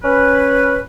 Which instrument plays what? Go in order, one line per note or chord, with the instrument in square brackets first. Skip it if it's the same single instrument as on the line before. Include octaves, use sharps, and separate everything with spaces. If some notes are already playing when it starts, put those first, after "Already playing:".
[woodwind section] C#4 B4